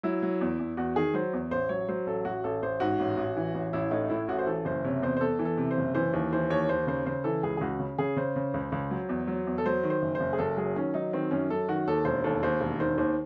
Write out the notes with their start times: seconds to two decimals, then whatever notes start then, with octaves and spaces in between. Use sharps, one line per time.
0.03 F#3 E4
0.22 F#3
0.41 E2
0.59 E2
0.77 E2 F#4
0.96 D#3 G#4
1.14 F#3 C5
1.33 E2
1.51 A1 C5
1.69 F#3 C#5
1.88 F#3 C5
2.06 A1 A4
2.25 A1 F#4
2.44 A1 A4
2.62 A1 C5
2.80 G#2 F#4
3.00 A1
3.17 A1
3.37 E3
3.55 A1
3.73 A1 E4
3.91 A2 D#4
4.10 A2 E4
4.28 A1 F#4
4.39 C5
4.47 E3 A4
4.65 F#1 C5
4.84 C3 C#5
5.02 E2 C5
5.17 C5
5.21 E2 A4
5.39 E3
5.45 A4
5.58 C3
5.71 C5
5.77 F#1
5.95 E3 C5
6.13 D#2
6.33 E3 C5
6.50 D#2 C#5
6.69 D#2 C5
6.87 C#3 C5
7.06 C#3 C5
7.24 E3 A4
7.43 C#2 G#4
7.57 G#4
7.61 C#2 F#4
7.79 C#3
7.98 C#3 G#4
8.16 C#3 C5
8.36 C#3
8.54 C#2
8.72 C#2
8.91 F#3
9.09 E2
9.27 F#3
9.47 E2
9.58 A4
9.66 F#3 C5
9.83 D#3
9.90 C5
10.02 F#1
10.15 C5
10.20 F#1
10.33 G#4
10.38 F#1 A4
10.57 F#3 G#4
10.76 D#3 C#4
10.94 F#3 D#4
11.13 D#3 C4
11.31 F#2 C#4
11.50 F#2 A4
11.68 D#3 F#4
11.87 D#2 A4
12.05 E1 C5
12.24 D#2 A4
12.43 D#2 C5
12.61 E1
12.79 D#3 C5
12.98 D#2 C5